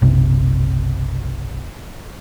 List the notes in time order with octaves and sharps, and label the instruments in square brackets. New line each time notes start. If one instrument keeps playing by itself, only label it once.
[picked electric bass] F#1 B1 C3